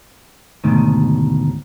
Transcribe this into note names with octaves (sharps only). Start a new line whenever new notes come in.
D2 G#2 B2 D#3